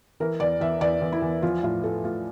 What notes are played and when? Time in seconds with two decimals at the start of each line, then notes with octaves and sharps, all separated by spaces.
0.20 E3 A#4
0.40 E2 D5
0.60 E2 E5
0.81 E2 D5
1.01 E2
1.12 E4
1.22 E2
1.42 F3 F4
1.63 A2 F4
1.83 A2 A4
2.04 A2 F4